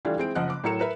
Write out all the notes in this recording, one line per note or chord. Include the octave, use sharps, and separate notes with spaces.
E3 G3 A3 D4 F4
E3 G#3 C4 D7
F#1 F3 D#5 F#5 F#6
D6
A2 F#3 E4 A#4 C#7 E7
A#4 B4 E5